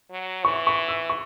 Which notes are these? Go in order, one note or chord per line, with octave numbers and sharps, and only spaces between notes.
F#3
E3 C#6
C#6
E6
C#6